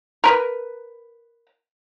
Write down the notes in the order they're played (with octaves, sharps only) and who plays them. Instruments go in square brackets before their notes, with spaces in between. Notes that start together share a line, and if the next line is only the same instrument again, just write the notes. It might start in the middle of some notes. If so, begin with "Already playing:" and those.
[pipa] A#4 B4